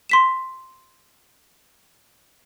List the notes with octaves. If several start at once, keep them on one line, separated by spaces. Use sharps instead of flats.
C6 B6 E7